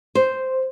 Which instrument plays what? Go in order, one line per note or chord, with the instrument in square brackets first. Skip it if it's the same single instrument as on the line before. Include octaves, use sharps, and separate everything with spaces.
[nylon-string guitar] C5